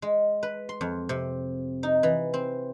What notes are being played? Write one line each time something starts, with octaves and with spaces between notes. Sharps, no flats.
G#3
B4
C6
F2
C3
D#4
E3
C4